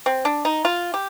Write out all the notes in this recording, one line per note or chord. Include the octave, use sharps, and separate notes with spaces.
C4
D4
D#4
F4
G4